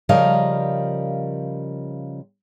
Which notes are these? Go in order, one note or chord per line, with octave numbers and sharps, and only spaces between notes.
C#3 F3 G3 A#4 D#5 F5